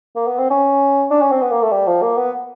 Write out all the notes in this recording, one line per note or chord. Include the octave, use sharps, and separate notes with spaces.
A#3
B3
C4
C#4
D4
C#4
C4
B3
A#3
A3
G3
F3
A#3
B3